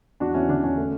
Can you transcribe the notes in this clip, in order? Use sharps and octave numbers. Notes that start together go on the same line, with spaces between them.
E2 D4 F#4
E2 C#4 E4
D3 D4
E2 C#4
A3